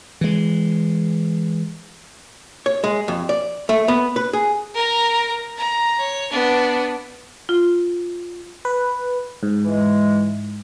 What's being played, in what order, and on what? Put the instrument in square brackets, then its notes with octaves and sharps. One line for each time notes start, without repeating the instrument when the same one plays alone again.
[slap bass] E3 G#3
[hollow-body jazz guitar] C#5
G#3
F2
D5
A3
B3
B4
G#4
[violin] A#4 A#5
A#5
C#5
B3 D4
[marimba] F4
[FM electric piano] B4
G#2
[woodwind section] E3 G#3